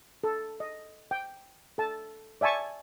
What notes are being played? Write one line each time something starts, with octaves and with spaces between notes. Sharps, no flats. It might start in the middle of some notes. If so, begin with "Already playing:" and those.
A4
D#5
G5
A4 A5
D5 E5 G#5 A5 C#6